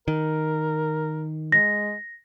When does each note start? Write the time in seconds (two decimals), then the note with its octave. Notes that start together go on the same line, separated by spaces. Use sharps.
0.08 D#3 A#4
1.52 G#3 A#6